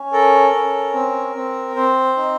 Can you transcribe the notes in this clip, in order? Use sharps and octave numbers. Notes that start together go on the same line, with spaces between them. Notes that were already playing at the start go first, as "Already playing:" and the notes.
Already playing: C#4
A4 A#4
C#4
C4
C4
C4 C5
D#4